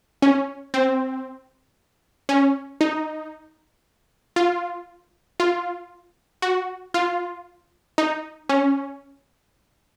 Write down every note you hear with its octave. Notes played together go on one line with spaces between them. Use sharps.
C#4
C4
C#4
D#4
F4
F4
F#4
F4
D#4
C#4